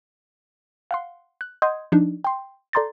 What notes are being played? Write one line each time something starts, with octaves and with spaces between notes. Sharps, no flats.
F5 F#5 C6
F#6
D#5 F#5 C6 D#6 G6 G#6
F3 D4 D#4
G5 C6
A4 D5 A#5 C6 G6 A6